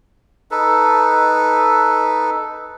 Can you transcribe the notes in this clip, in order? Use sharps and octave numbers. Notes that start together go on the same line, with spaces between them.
D#4 A4 B4